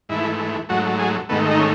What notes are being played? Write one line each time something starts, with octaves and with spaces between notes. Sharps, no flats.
G#2 E3 A3 E4
G#2 F#3 A3 F#4
G#4
G#2 D#3 A3 B3
D#4
C#4